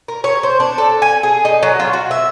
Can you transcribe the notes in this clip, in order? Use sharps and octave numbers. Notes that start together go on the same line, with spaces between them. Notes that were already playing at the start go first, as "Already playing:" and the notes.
A#4
C#5
C5
D4
A4
G#5
G#4
D#4
F#3
F4
F#4
E5